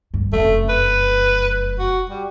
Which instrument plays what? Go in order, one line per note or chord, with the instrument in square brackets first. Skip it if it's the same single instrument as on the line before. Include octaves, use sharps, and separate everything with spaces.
[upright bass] G2
[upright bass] F1 F#2 [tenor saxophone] A3
[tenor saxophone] B4
F#4
G3